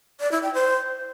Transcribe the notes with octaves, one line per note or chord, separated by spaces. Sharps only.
D5
E4
G5
C5